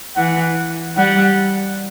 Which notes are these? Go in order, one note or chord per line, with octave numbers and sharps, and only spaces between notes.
E3 F#5
G3 F#5